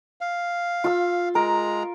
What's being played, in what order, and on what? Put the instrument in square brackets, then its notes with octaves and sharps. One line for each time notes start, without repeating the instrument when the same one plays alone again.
[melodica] F5
[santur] F4 E6
[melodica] G#3 A#5 [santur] A#4